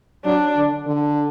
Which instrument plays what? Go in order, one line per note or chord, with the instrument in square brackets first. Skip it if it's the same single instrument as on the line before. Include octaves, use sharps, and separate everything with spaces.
[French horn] F#3 [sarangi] D4
[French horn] D3
D3